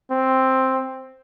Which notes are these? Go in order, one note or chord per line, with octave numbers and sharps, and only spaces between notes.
C4